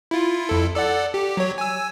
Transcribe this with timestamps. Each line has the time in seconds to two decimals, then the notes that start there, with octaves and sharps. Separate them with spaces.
0.11 E4 F4
0.49 F2 E4 A4
0.74 A4 D5 F#5
1.14 G4
1.37 F#3 C#5
1.58 G#5 E6